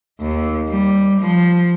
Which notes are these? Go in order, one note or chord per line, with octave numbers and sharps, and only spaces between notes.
D#2
G3
F3